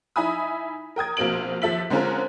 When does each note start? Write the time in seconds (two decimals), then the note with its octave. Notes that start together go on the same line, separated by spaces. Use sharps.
0.16 D#4 E4 E5 G#5 B5 D#6
0.96 A#4 G5 D#6 G#6
1.17 A#1 B2 A#3 C4 D7 F#7
1.62 D#2 F3 A4 E5 B6 F#7
1.90 D3 G#3 C4 C#4 F4 A#4